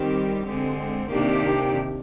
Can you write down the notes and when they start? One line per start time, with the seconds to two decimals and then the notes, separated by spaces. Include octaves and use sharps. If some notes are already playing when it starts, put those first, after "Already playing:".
Already playing: D#3 G3 C4 G4
0.49 D3 G#3 C4
1.11 C3 D#3 A#3 D4 G4